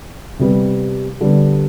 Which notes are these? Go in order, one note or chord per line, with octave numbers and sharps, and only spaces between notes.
C3 G3 B3
D3 G3 B3